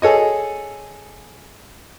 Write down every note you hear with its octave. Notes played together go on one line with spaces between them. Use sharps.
G#4 A4 C#5 D#5